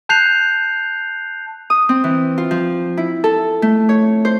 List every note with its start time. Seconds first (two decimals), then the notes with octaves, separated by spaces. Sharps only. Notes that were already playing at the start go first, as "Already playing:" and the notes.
0.09 A5 F#6 G6 C7 F7
1.70 D#6
1.89 C4
2.04 E3
2.38 F4
2.51 F3
2.97 E4
3.24 A4
3.62 A3
3.89 C#5
4.25 C5